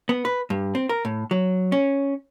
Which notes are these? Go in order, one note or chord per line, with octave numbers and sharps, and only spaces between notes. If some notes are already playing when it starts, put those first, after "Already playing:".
B3
B4
G2
C4
A#4
A2
F#3
C#4